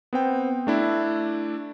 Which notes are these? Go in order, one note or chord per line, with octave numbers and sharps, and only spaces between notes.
B3 C4 G5
A3 D4 E4